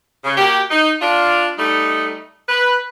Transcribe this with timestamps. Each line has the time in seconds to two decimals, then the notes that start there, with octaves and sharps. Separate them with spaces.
0.24 C#3
0.37 A#3 F#4 G4
0.71 D#4
1.01 D4 F4
1.58 G3 A3 D#4
2.49 B4